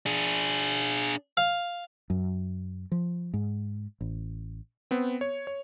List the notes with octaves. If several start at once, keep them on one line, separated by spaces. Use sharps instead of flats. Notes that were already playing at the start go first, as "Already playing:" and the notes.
D4 G#4
F5
F#2
F3
G#2
A1
B3 C4
C#5
C#5